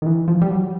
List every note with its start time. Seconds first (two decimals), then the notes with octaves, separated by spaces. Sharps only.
0.02 D#3
0.06 E3
0.28 F3
0.42 G3
0.49 F#3